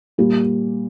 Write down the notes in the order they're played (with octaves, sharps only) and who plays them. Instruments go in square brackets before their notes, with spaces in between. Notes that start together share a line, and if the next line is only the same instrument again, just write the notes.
[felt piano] A#2 G3 A#3 G4